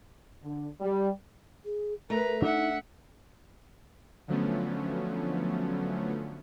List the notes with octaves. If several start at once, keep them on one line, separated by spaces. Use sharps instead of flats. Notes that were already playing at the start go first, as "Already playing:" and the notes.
D3
G3
G#4
A3 A#4 B4 A#5
D4 D#4 E5 F#5
D3 F3 F#3 A3 B3 C#4